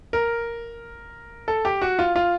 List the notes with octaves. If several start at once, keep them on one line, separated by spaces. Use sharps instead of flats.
A#4
A4
G4
F#4
F4
F4